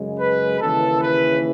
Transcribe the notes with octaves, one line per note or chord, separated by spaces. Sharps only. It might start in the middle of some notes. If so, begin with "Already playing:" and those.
Already playing: F#2 C#3 G#3
B4
D#2 C#3 E3 A4
B4